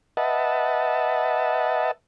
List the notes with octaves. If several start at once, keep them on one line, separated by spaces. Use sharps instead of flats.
B4 D#5 E5 F#5 A5